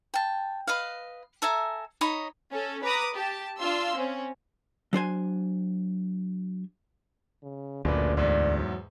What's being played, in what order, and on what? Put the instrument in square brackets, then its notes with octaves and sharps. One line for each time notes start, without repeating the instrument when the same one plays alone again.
[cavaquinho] G5 A5
B4 D#5 F5
A4 E5 G#5 A#5
D#4 C#5 D#5 B5
[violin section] C#4 A4
B4 A#5 D6 D#6
G4 A5
D4 F4 F5 C6 E6
C4 C#4
[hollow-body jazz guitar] F#3 D4 C5 G#5
[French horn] C#3
[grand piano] F#1 A#2 B4 [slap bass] D2 [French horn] D5
[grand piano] E2 G#2 [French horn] D5
[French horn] F#3